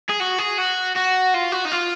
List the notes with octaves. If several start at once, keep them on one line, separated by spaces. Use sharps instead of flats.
G#4
F#4
G#4
F#4
F#4
F4
F#4
D#4
F4